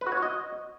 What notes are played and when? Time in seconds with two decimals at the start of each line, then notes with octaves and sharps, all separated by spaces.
0.01 B4
0.07 F#4
0.12 C#5
0.17 F#4
0.23 D#5